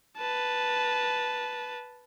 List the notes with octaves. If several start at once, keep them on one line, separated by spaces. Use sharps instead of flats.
B4 A5